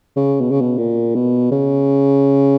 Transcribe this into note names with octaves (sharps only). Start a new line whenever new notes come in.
C#3
B2
C#3
B2
A#2
B2
C#3